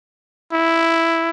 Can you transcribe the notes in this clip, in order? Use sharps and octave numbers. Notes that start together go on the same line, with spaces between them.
E4